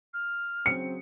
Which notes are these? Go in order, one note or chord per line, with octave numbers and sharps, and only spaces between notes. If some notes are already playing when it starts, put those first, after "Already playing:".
F6
C#3 F#3 C4 C#7